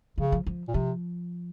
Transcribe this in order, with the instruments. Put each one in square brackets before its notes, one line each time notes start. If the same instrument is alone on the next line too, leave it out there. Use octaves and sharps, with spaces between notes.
[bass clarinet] C#3 [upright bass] F3
[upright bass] F3
F3
[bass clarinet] A#2
[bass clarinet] C3 [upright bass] F3